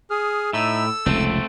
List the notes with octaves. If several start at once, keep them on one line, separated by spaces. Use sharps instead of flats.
G#4 D#6 F6
A2 D#4 E5 E6
A4
F1 C#2 A3 C4